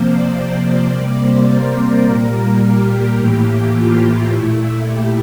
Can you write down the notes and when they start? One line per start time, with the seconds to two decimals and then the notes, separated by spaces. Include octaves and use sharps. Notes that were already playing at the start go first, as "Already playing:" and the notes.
Already playing: C3 F3 A#3 C5
0.10 D5
0.37 C5
0.93 C3 G3 A#3 D5
1.22 C5
1.50 A#4
2.06 A#2 G3 A#3
2.62 G4
3.19 A2 E3 A#3
3.75 F4
4.31 A#2 A3 E4
4.88 G4